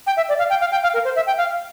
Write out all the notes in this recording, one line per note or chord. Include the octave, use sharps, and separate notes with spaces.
G5
E5
D5
F5
G5
F5
G5
F5
A#4
C5
E5
G5
F5